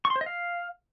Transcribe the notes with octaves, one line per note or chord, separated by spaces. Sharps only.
C#6
C6
C5
D#5
F5